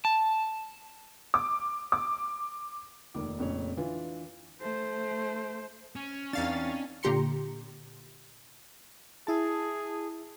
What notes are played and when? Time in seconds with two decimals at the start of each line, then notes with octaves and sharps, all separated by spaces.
0.05 A5
1.34 D6
1.92 D6
3.14 F1 D#2 D#3 D6
3.39 F1 F2 A#2 C#3 C#5
3.77 E3 D4 F4
4.62 A3 C5
5.96 C#4
6.33 E2 C4 D4 D#4 F5 A6
7.03 A#2 D3 G4 A#5 C6 C#7
9.27 E4 G#4 A5